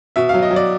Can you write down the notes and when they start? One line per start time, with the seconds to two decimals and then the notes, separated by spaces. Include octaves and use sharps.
0.16 B2 E5
0.29 F#3 F5
0.42 D#5
0.51 F#3
0.56 D5